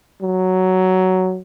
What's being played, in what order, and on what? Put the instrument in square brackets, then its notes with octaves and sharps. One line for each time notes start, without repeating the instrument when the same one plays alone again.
[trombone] F#3